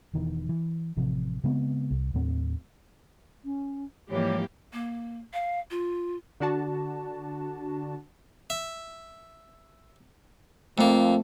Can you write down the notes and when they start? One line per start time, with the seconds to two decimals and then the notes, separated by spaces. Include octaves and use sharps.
0.13 E1 E2 D#3 E3
0.49 E3
0.97 A1 C3 F3
1.44 C#3 G#3 B3 C4
1.91 C2
2.14 D#2 A2 C4
3.44 C#4
4.10 G#2 E3 F3 G3 A#3 G4 C#5
4.73 A#3
5.33 F5
5.71 F4
6.40 D3 D4 F#4 A5
8.50 E5
10.78 F2 F3 A3 A#3